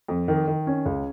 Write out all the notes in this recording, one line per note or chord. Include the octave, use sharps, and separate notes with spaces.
F2
D#3
D#3
C#4
C#2